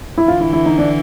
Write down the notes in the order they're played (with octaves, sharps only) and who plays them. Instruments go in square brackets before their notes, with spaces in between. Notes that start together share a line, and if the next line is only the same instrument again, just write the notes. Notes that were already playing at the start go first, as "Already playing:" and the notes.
[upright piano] E4
[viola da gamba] D3 E3 [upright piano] F4
[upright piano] E4
E4
D#4
D4